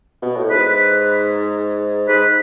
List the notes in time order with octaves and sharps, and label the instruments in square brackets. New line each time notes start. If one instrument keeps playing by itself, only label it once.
[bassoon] B2
A2
[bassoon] G#2 [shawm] B4
[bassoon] G#2 [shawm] B4